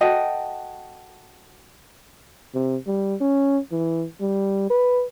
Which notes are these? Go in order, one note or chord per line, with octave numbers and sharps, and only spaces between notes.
F#4 A4 D#5 G5
C3
G3
C#4
E3
G3
B4